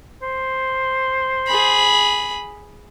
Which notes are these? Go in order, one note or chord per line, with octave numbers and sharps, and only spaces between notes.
C5
G#4 B5